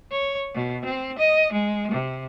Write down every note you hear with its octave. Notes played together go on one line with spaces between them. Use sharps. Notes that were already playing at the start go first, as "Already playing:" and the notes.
C#5
B2
C4
D#5
G#3
C3